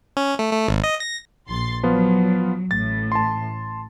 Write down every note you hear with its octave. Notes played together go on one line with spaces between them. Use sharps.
C#4
A3
A3
G#1
D#5
A#6
A#1 C6 A6
F3 F#3 B3 F4
A1 A2 A6
A5 C6